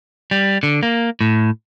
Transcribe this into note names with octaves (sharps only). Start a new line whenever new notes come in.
G3
D3
A#3
A2